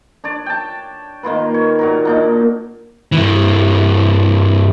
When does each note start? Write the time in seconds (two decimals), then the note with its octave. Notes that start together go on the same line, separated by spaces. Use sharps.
0.24 D4 C#5 D5
0.46 G5 A5
1.23 D#3 A#3 F4 B4
1.54 C#5
1.79 A#2 F#4 A#4
2.05 A#3 D4 D#4
3.12 G2 E3